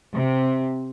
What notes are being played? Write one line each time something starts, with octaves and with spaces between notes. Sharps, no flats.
C3